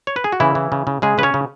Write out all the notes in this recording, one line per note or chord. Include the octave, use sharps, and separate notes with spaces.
C#5
B4
G#4
F#4
C#3 E3 E4
E3
C#3
C#3
C#3 G#3 G#4
C#3 B4
C#4 C#5
C#3